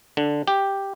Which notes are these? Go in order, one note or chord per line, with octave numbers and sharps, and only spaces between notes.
D3
G4